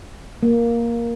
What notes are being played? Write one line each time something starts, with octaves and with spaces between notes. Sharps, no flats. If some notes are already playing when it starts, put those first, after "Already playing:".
A#3